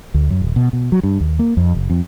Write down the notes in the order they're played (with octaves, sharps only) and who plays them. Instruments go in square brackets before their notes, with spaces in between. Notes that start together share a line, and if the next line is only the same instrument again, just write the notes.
[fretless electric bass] D2
F#2
D#1
B2
B2
F#3
G2
D#2
A#3
F2
F#1
F2